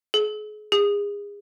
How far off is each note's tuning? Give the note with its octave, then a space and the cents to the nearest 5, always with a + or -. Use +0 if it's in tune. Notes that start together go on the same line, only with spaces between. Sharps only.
G#4 +35
G#4 -30